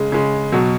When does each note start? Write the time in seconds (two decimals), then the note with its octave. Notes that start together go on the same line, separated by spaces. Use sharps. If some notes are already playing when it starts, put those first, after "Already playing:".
Already playing: C#3 G#3
0.12 C#3 G#3
0.52 B2 F#3